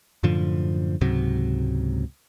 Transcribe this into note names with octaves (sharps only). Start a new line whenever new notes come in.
F#2 A2 D3 F3
C#2 G#2 C3 F#3